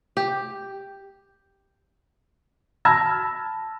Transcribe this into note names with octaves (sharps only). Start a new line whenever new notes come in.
G4
A5 B5 E6 F6 G#6 A#6